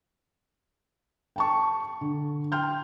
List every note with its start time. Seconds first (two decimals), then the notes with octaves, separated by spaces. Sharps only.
1.36 G5 A5 C#6
2.01 D3
2.52 G5 C6 F6 G6